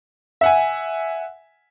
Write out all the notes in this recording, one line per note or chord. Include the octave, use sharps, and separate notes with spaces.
E5 F#5 G#5